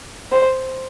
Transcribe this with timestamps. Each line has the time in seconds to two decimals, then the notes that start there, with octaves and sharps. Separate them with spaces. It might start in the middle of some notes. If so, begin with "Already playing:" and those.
0.32 C5